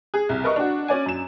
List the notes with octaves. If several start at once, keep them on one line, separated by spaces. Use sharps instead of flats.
G#4
C2
A#4 B4 D#5 C#6
D4 F#4
C#4 D5 G#5
F#2 E7